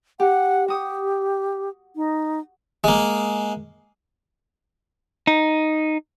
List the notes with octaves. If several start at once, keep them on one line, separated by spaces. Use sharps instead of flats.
G4 F#5
F#4 G4 D#6
D#4
G#3 A#3
D#4